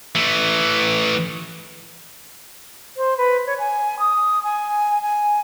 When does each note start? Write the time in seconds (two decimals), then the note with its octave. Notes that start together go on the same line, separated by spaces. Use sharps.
0.15 E3 A3
2.97 C5
3.17 B4
3.47 C#5
3.59 G#5
3.99 D#6
4.43 G#5
5.02 G#5